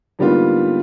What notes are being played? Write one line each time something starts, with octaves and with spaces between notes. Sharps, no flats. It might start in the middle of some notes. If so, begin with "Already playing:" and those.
G#2 D3 G3 A#3 B3 F4